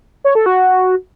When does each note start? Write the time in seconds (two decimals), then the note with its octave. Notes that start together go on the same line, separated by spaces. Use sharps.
0.25 C#5
0.35 A4
0.46 F#4